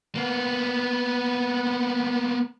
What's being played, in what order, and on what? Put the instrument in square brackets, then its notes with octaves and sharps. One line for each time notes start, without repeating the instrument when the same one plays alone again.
[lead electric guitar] A#3 B3